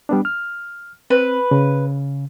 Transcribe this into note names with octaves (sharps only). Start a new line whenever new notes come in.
G3 B3 D4
F6
C4 B4
C#3